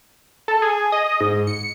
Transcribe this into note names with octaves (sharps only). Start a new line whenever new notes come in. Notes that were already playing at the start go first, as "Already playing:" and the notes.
A4
G#4
D#5
G#2
C#7